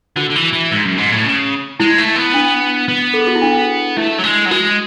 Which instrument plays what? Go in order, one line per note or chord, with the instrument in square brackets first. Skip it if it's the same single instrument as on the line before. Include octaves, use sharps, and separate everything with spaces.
[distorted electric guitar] D3 [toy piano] F#4
[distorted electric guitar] D3
E3
E3
G#2
F#2
G#2
A2
C#3
[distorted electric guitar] G#3 [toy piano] E4
[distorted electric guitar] A3
B3
[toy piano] D4
[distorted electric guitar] B3
[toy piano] A4
G#4
F#4
E4
D4
[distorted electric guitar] A3 [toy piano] E4
[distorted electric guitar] F#3
G#3
F#3
[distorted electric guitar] G#3 [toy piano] F#4